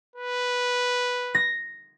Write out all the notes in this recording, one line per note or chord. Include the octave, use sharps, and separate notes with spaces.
B4
A#6